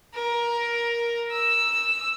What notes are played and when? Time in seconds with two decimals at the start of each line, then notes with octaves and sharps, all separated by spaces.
0.14 A#4
1.31 E6